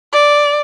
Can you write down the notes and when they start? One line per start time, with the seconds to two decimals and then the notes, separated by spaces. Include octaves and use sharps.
0.13 D5